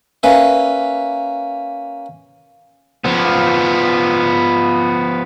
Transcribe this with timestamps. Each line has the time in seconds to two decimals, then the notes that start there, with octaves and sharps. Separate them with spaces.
0.23 A#3 C#4 B4 E5
3.05 F3 B3